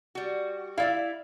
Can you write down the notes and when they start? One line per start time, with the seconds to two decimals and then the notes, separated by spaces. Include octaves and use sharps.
0.15 G3 F#4
0.78 E4 D5 E5 F5